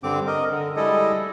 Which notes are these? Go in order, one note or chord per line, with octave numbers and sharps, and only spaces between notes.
G2 D3 C4 D6
A#4 D#5
D3
G3 G#3 E4 A4 D#5